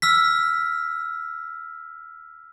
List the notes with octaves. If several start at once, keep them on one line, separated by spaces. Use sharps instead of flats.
E6 F6 B6